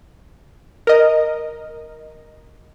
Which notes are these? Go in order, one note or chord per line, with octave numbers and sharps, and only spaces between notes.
A#4 D#5